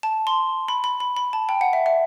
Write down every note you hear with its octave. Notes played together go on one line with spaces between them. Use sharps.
A5
C6
B5
B5
B5
B5
A5
G5
F#5
E5
E5